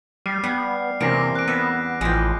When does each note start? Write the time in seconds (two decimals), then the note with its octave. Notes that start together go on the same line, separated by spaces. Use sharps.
0.26 G3 D6 F6 C7
0.44 G3 B3
1.01 E2 C3 A#3 C4 C#4 D6 A#6 D7
1.35 F#6 D7
1.48 B3 E5
2.01 A1 E3 F3 G#3 G5